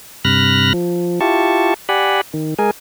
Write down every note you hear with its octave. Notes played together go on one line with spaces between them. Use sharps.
G2 C3 B5 F6 F#6 A#6
F3
E4 F4 G4 A5 C#6
G4 D5 F#5 G#5 B5
D#3
G#3 G#4 A#4 G#5